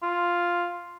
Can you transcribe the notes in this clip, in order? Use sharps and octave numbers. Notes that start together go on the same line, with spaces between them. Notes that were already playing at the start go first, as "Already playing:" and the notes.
F4